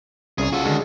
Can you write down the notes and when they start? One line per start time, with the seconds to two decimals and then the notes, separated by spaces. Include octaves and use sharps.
0.38 C2 C#3 G#4 C#5
0.53 F4 F#4 A4
0.65 D3 D#3 G#3